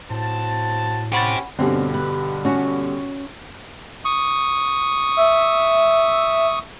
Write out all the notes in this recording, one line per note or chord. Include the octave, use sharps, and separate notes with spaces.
A2 C4 F#4 A5
C#4 G4 C5 F#5 B5 A6
G2 B2 D3 C4 C#4
B4
C#4 F#4
C#6 D#6
E5